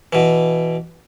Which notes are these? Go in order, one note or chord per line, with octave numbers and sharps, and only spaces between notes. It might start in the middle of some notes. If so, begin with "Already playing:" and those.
B2 E3